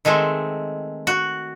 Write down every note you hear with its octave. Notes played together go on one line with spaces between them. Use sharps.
D#3 G#3 A3 C4
F#4